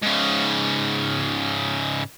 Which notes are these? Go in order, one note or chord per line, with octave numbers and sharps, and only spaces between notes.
G#2 C#3